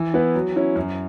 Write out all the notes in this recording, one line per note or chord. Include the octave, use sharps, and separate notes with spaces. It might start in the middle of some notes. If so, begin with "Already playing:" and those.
Already playing: E3
B3 E4 B4
F#3
C#4 E4
F#2